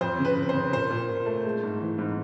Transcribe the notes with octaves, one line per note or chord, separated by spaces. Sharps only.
F2 C5
C#3
B4
C#3
C5
C#3
A#2 C5
A#2
A#2
A3
G#3
G#2
E3
G#2